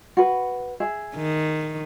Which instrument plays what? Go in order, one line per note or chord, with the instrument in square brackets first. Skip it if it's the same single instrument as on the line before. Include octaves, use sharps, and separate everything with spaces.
[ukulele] F#4 B4
G#4 E5
[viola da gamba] D#3